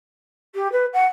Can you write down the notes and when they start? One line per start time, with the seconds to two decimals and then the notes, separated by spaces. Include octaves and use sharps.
0.55 G4
0.72 B4
0.93 F#5